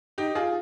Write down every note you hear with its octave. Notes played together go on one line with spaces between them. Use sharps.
D#4 G4
F4 G#4